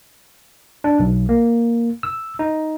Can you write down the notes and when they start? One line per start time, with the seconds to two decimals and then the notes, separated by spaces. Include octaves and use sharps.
0.84 D4
0.99 B1
1.29 A#3
2.03 E6
2.39 D#4